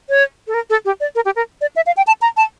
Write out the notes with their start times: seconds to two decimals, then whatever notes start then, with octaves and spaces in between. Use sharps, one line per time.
0.09 C#5
0.47 A4
0.54 A#4
0.70 A4
0.85 G4
1.00 D5
1.15 A#4
1.25 G4
1.36 A#4
1.61 D5
1.76 E5
1.86 F5
1.97 G5
2.07 A5
2.22 A#5
2.37 A5